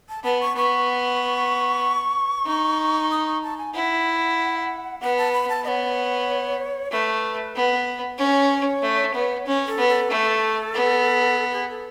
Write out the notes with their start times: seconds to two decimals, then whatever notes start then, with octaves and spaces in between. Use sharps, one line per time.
0.09 A5
0.24 B3 A5
0.41 C#6
0.55 B3 C#6
2.46 D#4
3.11 D#6
3.26 C#6
3.43 A5
3.58 G#5
3.74 E4 F#5
5.01 B3 F#5
5.17 A5
5.33 B5
5.49 A5
5.64 B3 D#5
5.68 C#5
6.91 A3 B4
7.56 B3
8.18 C#4 C#5
8.82 A3
9.14 B3
9.46 C#4
9.67 A4
9.77 B3
9.88 A4
10.10 A3
10.74 B3
11.53 G#4
11.69 A4